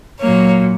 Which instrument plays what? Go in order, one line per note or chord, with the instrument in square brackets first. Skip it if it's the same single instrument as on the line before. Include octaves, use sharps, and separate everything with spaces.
[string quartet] A#2 F#3 A#3 C#5